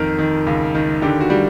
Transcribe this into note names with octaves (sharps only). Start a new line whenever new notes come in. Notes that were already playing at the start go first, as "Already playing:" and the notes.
Already playing: F2 D#3 A#4
D#3
C#2
D#3
D3 G4
F#4
G3